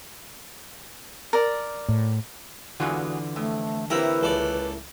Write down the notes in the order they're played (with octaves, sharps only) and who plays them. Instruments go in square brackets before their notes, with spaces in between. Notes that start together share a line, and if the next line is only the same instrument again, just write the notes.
[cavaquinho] A#4 D5
[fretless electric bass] A2
[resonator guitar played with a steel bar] E2 G#3 F#4 [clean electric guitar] D3 E3 F4
[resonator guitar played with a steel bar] F2 [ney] A3
[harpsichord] C3 A#4 [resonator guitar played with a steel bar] A#3 E4 G4 [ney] B4
[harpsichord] C#2 A4 D5